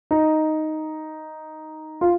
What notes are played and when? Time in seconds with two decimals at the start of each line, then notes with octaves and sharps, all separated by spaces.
0.11 D#4
2.01 F4